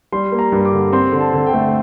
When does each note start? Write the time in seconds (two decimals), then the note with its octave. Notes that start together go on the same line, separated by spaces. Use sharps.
0.12 G3 C6
0.32 A#3
0.39 A#5
0.52 G2
0.65 D6
0.72 D3
0.93 C4 C6
1.12 D3
1.20 A5
1.33 D3
1.46 G5
1.54 A3